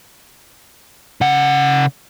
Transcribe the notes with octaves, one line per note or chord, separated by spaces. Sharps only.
C#3 F#5